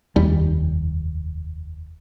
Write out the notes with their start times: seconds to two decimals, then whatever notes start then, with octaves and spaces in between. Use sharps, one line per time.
0.16 F1 D#2 G3